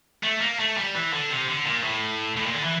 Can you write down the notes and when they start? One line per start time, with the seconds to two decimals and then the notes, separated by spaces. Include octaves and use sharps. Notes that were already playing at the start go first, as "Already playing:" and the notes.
0.24 A3
0.41 A#3
0.59 A3
0.77 G3
0.95 E3
1.13 D3
1.30 C3
1.48 D3
1.65 A#2
1.84 A2
2.36 A2
2.46 A#2
2.54 D3
2.64 E3